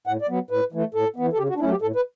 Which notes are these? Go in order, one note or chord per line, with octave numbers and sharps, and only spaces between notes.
A2 F#5
D5
F#3 B3
A2 B4
E3 A3
A2 A4
E3 B3
A4
C#3 G4
F#4
D4
F#3 A3 C#4 E4
G4
A2 A4
B4